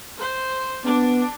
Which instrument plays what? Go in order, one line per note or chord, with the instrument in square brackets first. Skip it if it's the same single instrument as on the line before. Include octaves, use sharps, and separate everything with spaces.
[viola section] C5
[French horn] B3 [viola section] D4